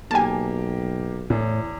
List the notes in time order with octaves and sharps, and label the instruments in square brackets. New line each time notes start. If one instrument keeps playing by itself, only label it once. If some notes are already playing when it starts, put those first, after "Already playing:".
[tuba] B1 [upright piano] A#3 G4 [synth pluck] G#5 A5
[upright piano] E2 [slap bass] A2